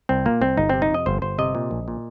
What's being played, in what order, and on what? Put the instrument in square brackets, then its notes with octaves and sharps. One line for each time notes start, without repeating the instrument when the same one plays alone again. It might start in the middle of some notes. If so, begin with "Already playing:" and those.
[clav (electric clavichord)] C2 C4
A#2 A#3
C2 C4
G1 D#4
C3 C4
D#4
F2 D#5
G1 C5
G1 C5
C3 D#5
A#2
A#1
A#2